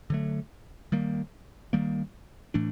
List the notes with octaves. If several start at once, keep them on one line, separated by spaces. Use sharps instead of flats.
D3 F#3 A3
D#3 G3 A#3
D#3 G3 A#3
A2 E3 A3 D4